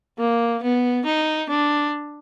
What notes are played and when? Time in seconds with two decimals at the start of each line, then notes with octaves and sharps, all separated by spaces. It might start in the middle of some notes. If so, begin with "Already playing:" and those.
0.19 A#3
0.62 B3
1.05 D#4
1.49 D4